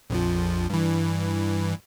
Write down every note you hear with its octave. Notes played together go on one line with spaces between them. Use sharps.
A#1 F2 F3
G2 E3